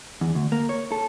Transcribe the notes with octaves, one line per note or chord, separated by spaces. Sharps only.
E2
D2
A#3
C#5
A4